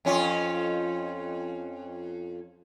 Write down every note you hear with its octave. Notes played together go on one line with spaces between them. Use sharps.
F2 C#4 F4